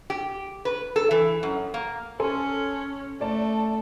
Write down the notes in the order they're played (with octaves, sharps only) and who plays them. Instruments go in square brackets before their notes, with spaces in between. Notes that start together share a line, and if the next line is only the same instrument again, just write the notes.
[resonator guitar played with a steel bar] G4
B4
A4
E3
F#2
A#3
[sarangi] C#4 [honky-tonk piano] A4 G#5 C6
[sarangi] A3 [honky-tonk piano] D5 A5